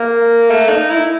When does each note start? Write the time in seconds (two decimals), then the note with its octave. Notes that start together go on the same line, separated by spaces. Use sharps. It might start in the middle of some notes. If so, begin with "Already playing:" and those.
Already playing: A#3
0.50 A3
0.69 D#4
0.90 E4